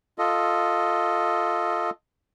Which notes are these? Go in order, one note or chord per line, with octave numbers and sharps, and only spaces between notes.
F4 A4 D#5